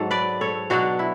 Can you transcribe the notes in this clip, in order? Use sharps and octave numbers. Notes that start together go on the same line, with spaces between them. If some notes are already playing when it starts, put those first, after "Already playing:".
Already playing: G#2 F#3 A4
B4 D5
A4 C#5
B2 F#3 D4 F#4
E4